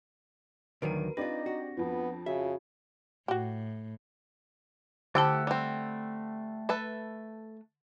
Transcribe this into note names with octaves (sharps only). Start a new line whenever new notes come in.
D2 D#3 F#3 A#4 B4 D7 D#7
C4 D4 D#4 F4 G4 B4 D5 A#6
F#4
F2 F3 B3
C#3 F#4 E5
A2 F#4 G4
D3 A3 E4 G4 F#5 A5 E6
G3 C4
A4 B4 E5